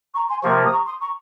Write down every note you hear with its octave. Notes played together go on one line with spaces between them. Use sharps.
A#5 C#6
G#5 C6
C3 F3 A#3 A#5 C#6
D#6
A#5 C#6
C6 D#6
A#5 C#6